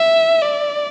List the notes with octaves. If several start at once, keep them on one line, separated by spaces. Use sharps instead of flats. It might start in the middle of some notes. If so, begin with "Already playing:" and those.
Already playing: E5
D5